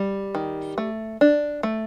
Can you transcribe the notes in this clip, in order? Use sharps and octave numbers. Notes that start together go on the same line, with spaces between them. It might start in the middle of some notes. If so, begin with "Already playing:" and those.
Already playing: G3
D#3
A3
D4
A3